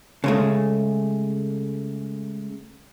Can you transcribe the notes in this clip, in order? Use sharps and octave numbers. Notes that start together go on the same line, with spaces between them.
C#3 G#3 A3